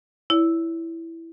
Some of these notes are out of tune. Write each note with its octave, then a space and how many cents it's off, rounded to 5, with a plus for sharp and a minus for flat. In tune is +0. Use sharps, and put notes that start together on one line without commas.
E4 +0 C#5 +45